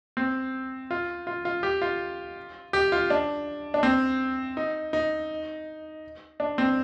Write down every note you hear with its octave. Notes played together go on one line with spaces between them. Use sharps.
C4
F4
F4
F4
G4
F4
G4
F4
D4
D4
C4
D#4
D#4
D4
C4